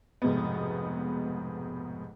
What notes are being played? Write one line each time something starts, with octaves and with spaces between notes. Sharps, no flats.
F1 G#2 B2 B3